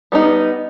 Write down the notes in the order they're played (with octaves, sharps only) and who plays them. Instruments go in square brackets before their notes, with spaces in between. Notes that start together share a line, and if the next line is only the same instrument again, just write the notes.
[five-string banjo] G3 B3 D#4